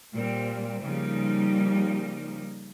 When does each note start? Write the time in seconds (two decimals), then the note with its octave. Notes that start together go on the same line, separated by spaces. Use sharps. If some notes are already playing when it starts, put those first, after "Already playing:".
0.12 A#2 G3 C4
0.82 C#3 F3 G3 A#3 D#4